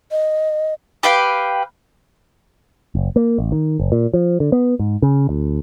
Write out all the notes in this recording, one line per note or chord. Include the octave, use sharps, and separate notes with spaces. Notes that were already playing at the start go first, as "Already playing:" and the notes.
D#5
G4 B4 F5 G5
F#1
A#3
A1
D#3
F#1
A#2
F3
D3
B3
G#2
C#3
D2